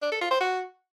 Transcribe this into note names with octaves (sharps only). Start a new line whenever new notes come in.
D4
A4
F4
C5
F#4